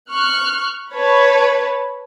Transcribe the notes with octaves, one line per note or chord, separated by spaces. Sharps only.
C#6 F6 F#6
B4 C#5 A5 B5